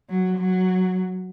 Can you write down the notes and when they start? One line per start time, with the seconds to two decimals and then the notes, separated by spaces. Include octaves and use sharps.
0.09 F#3
0.37 F#3